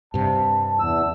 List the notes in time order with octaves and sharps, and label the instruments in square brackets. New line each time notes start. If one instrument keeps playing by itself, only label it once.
[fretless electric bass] G2 C3 [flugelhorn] A5
[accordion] E2 E6